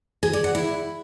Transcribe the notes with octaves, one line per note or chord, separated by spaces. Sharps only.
G#4
D5
F#5
E4